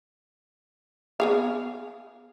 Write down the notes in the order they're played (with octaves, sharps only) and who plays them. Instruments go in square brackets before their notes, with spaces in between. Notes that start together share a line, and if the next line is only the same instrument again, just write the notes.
[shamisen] B3 G#4 F5